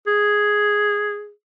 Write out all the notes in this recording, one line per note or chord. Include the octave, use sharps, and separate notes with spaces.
G#4